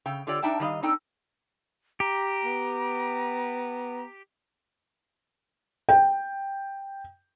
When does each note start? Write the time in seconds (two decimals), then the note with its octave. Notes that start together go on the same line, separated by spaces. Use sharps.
0.06 C#3 G5
0.27 D3 F4 G4 C#5 D5 G5
0.43 D4 D#4 E5 G5 A5
0.60 D#3 G3 D#5 F5
0.82 C4 D4 D#4 A4 G5
2.00 G4 A#5
2.45 B3
5.89 G5